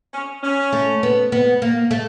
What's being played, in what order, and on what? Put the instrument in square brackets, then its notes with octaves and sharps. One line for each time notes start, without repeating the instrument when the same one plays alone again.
[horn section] C#4
C#4
[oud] A3
B3
B3
A#3
A3